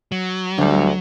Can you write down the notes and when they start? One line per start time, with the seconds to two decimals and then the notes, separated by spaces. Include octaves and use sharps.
0.12 F#3
0.58 D2 D3 G3